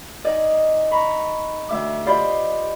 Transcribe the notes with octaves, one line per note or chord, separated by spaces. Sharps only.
D#4 D5 D#5 G#5
A#5 B5 C#6
D2 E5 D6
F4 G4 C5 D5 D#5 B5